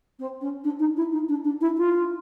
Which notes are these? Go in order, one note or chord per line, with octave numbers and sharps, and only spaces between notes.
C4
C#4
D4
D#4
E4
D#4
D4
D4
E4
F4